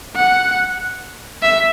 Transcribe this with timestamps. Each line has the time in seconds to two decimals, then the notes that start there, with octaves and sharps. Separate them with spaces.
0.16 F#5
1.42 E5